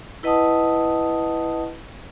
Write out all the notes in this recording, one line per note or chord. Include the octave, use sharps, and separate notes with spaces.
E4 B4 D#5 F#5 A5 D#6